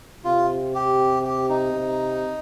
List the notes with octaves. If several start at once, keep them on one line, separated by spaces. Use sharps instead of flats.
C3 F4
G4
G4
D#4
C3